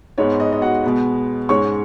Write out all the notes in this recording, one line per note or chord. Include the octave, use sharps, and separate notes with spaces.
G#2 G#3 B3 C#5
D#5
D#5
F#4 F#5
B2 G#3 B3
G#2 G#3 C#4 C#5 C#6